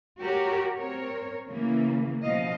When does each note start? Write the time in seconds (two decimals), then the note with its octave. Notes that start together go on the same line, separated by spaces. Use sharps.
0.21 F#4 G4 A#4 C#5
0.77 C4 A#4 C#5
1.48 C#3 E3 A#3
2.23 B2 F3 D#5 F5